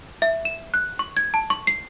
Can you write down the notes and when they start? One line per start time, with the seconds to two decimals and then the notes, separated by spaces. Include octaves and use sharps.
0.22 E5
0.45 E7
0.74 F#6
0.99 C#6
1.17 G#6
1.34 A5
1.50 C#6
1.67 C7